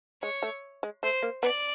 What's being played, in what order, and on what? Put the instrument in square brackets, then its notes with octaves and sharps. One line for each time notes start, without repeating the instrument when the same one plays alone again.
[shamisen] G#3 [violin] C#5
[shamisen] A3
G#3
[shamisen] A3 [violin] C5
[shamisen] A#3
[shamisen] B3 [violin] D5